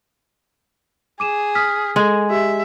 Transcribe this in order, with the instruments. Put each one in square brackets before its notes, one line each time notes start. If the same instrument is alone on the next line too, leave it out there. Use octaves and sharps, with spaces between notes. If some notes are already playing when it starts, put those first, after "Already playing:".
[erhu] G#4 [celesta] D6 D#7 E7
[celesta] D#6 F6 B6
[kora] G#3 [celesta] A4 G#5
[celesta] G4 [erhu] E5